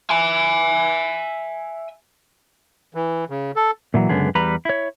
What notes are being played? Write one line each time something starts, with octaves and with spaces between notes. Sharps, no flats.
E5 G#5
E3
C#3
A4
A#2 E3 F#3
C#2 F#2 D3 B3 G#4
E2 G3 B4 A#5
E4 C#5